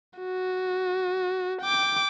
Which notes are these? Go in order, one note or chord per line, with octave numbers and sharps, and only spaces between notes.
F#4
G5 D6